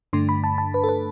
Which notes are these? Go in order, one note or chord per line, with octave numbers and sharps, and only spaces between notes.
G2 D3 A3 D4 C6
B5
A5
A5
B4
A4
B4